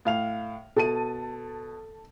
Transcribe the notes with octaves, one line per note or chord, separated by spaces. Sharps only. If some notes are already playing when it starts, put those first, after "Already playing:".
A2 F5 F7
B2 A4 A5 D#7